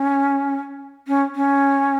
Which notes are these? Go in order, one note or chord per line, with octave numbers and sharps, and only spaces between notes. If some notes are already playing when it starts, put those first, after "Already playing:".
Already playing: C#4
C#4
C#4